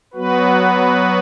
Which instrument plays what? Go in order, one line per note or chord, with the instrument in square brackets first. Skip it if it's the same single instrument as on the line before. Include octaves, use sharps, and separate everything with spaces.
[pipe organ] F#3 B3 F#4 B4